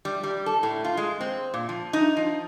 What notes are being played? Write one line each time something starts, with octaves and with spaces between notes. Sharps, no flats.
G3
G3
A4
A2
F4
G#3
C4
A#2
F3
D#4
F3